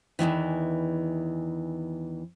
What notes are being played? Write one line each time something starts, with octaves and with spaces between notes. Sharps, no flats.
E2 G#2 D#3 E3